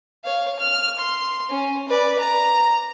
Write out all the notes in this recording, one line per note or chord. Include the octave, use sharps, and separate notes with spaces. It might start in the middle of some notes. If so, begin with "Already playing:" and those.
C#5 F5
F6
C6
C#4
B4 D5
A#5